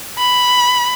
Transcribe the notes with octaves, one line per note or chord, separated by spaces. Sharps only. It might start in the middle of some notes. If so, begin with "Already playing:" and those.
B5